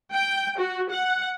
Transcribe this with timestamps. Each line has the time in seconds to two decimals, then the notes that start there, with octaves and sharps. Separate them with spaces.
0.13 G5
0.60 F#4
0.91 F#5